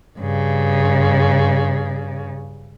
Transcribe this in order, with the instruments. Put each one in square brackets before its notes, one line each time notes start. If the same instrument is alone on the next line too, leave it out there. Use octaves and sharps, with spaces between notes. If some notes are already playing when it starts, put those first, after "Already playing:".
[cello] G2 C#3